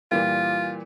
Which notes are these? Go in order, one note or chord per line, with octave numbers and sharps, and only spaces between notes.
A#2 E3 G3 F4